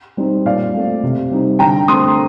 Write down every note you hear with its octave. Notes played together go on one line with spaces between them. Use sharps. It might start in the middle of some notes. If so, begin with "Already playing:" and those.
G3 C4 D#4
A#2 D5 F5
A3 C4
C3
G3 C4 D#4
D3 G5 A#5
A3 C4 C6 D#6